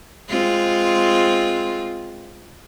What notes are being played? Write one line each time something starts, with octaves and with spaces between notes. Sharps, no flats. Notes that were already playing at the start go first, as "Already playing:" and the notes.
G#3 C4 F4